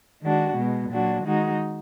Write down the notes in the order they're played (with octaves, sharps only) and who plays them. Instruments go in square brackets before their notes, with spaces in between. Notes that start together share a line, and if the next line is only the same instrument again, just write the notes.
[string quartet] D#3 G#3 D4 F#4
B2 G#3 B3
A#2 F#3 D4 F#4
D#3 G#3 D#4 F#4